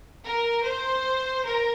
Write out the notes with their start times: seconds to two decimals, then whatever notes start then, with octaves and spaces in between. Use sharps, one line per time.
0.25 A#4
0.64 C5
1.44 A#4